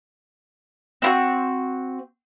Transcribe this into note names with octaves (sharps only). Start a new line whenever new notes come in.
C4 E4 F#4